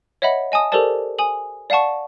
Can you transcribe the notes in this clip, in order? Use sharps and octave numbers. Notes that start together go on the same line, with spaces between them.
C#5 D#5 E5 F#5 B5
D#5 G#5 A5 D#6
G4 A4 A#4 C5 D5 A5
G#5 D#6 F#7
D5 F5 F#5 A5 C#6